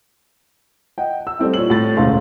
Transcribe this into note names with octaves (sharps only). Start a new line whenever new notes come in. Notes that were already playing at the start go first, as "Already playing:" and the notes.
D#5 F#5 G5
E6
G3 A3 C4 E4
A#2 C#5 E6 F#7
A2 A6
E1 D2 C#3 C#4 F5 C6